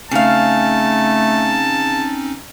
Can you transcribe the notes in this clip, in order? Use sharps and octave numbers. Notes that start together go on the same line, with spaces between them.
C#3 A3 C4 C#4 D#4 F5 A5